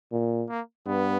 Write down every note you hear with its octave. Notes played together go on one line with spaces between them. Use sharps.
A#2
A#3
G2 B3